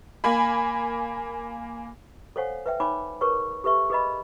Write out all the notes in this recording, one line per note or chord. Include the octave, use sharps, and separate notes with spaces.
A#3 G#5 B5
A4 C5 C#5 F5 F#5 G#5
B4 E5 G5
D#4 C#5 G#5 B5 D6
G#4 A#4 B4 C#5 C#6
G4 A4 B4 E5 C#6
G#4 B4 D#5 B5